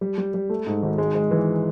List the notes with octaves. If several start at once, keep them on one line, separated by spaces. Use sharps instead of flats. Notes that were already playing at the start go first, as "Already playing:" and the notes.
G3
G3
G3
A3
G#2
G#1
G#3
G#3
E3